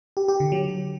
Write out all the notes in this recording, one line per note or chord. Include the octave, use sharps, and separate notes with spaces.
G4
G4
D3
F#3